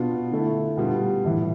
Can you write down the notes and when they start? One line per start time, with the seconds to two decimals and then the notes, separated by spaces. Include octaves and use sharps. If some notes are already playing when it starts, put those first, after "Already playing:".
Already playing: B2 B3 D4 F4
0.31 D3 A3 E4
0.77 B2 G3 D4 F4
1.25 A2 E3 G3